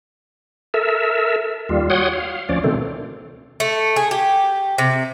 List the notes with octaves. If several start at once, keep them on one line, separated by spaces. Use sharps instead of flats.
A4 A#4 E5
D#2 G3 F4
F#4 C#5 F#5 G5 C6 D#6
F5
D2 F3 C#4 D5
B2 D3 D#3 A3 C4
A3
G#4
G4
C3